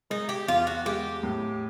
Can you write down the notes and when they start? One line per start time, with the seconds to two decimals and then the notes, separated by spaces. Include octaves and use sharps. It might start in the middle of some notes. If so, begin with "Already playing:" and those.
0.10 G#3 D#4
0.29 G4
0.48 E2 F4
0.67 F#4
0.86 G#3 G4
1.23 A2